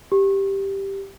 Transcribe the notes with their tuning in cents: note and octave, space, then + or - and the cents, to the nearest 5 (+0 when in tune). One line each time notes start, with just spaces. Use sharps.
G4 +0